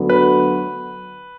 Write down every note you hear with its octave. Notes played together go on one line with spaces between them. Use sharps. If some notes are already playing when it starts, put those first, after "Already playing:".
Already playing: D2 D3 F#3 B3 F#4
B4